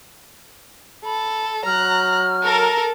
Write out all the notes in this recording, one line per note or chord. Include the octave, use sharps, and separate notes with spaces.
A4 B5
F#3 A#5 F6 F#6
A4 A#4